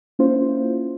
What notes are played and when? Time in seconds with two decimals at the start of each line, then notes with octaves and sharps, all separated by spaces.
0.19 A#3 C#4 E4 F4 C5